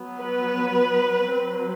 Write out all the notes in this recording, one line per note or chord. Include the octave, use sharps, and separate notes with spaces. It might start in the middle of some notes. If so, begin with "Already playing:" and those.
Already playing: F#3 B3
B4
F#3 C4